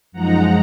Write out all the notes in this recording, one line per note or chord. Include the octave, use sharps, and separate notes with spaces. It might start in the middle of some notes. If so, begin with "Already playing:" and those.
F#2 F3 G#3 D#4 F#5 A#5